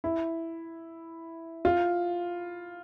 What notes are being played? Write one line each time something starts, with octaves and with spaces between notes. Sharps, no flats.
E4
F4